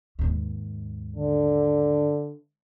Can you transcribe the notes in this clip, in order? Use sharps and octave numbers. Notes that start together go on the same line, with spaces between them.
D#2 G#2
D3